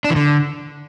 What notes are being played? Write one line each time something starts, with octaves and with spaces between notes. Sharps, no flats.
D4
E3
D3